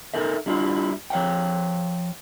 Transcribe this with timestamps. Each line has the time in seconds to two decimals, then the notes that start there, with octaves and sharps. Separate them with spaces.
0.14 D#4 A4 A#4 E5
0.46 G3 D4 E4 F4
1.10 F3 C#5 F5 G5